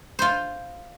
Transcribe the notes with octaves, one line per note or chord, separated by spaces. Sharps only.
F4 C5